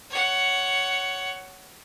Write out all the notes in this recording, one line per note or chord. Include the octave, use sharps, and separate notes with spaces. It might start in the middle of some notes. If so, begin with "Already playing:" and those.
C#5 F#5